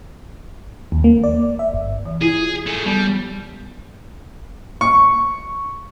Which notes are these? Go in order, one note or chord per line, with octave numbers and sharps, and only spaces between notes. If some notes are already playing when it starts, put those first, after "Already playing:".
D#2
A#3
D5
E5
G1
E3
E4 F4 G#4
A3 G#4
G3 B3
C#6